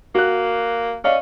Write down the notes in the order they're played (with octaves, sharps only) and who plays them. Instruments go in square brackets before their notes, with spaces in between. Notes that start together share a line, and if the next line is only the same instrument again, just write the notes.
[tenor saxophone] A#3 [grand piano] F#4 F#6
[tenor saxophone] C#4 [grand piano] D5 D#5 F5